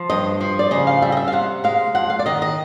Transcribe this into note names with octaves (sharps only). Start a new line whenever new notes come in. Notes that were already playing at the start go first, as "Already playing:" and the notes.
Already playing: F3
G2 D#5
F3
D5
C#3 D#5
F5
G3 E5
D#5
E5
F5
C3 F#5
G#3 F5
F2 F#5
F5
D5
D#3 D#5
D#5